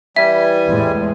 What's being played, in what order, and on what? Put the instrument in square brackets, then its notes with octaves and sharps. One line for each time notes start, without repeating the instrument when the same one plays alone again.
[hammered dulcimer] E3 [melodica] G3 G#5 [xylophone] E5
[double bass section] E2 A2 G#3